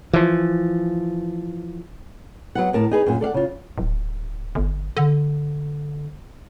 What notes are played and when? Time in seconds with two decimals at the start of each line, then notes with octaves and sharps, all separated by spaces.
0.13 E3 F3
2.55 F#3 B3 F#5
2.73 A2 A#4 A5
2.91 D#4 G#4 B4
3.06 F#2 A#2
3.21 A4 D5 F5 F#5
3.34 C#3 F4
3.78 D1
4.55 G1
4.97 D3